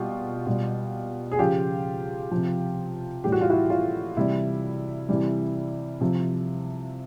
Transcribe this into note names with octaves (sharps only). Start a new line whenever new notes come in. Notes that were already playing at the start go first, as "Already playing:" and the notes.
Already playing: B2 G3 F4 G4
B2 G3
G#4
C#3 F3 F4 G4
C3 F3
A2 E3 G3 G4
F#4
F4
E4 F#4
F4
C3 E3 G3 E4
C3 E3 G3
C3 F3